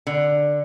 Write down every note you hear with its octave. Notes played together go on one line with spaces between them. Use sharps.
D3